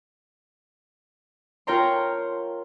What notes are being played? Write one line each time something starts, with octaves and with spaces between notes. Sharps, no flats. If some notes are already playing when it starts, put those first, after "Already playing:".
F4 A#4 C#5 G5 A#5 C6